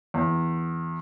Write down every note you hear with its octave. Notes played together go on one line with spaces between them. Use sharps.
E2